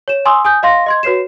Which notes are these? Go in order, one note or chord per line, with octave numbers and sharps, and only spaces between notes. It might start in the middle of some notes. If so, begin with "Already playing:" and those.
C#5 E7
G#5 C6 C#6 D#6 E6
G#5 D#6 G6
D#5 F5 C6 A#6
D#5 C6 G#6
F#4 B4 C#5 C7 E7